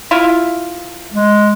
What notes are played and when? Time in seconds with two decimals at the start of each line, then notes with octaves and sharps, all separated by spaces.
0.11 E4 F4
1.14 G#3